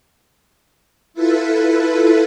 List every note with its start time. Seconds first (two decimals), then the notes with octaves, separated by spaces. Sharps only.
1.14 E4 F4 A4 B4